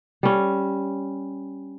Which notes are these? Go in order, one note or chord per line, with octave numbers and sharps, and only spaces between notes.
G3 C#4